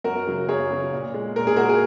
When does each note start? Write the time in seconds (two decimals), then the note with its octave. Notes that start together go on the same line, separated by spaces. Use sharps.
0.04 F#2 F#4 A#4
0.27 C#3 F#3
0.48 F#2 G#4 C#5
0.70 C#3 F#3
0.92 A#2
1.14 G#3
1.36 A#2 A#4
1.47 G#4
1.57 G#3 F#4 A#4
1.69 G#4